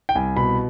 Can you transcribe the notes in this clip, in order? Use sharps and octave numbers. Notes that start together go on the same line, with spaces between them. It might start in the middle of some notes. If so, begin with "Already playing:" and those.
G5
C2 G#5
B2 B5